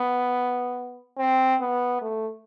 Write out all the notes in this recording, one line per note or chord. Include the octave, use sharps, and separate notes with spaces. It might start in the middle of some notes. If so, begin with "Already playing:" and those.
Already playing: B3
C4
B3
A3